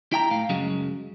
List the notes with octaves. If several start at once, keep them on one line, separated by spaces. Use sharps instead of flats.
E4 G5 A#5
A2 F5
F#2 C#3 F#3 G#3